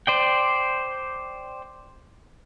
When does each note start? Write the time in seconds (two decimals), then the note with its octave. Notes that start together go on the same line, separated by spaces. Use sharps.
0.07 C5 D5 G5